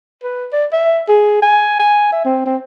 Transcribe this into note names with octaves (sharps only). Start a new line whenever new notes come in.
B4
D5
E5
G#4
G#5
G#5
E5
C4
C4